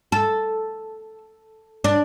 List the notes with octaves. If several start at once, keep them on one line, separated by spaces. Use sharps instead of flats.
A4
D4